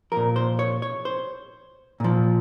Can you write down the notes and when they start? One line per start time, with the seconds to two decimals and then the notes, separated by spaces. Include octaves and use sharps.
0.12 A#2 F3 A#4
0.36 C5
0.59 C#5
0.82 C#5
1.05 C5
2.00 A#2 F3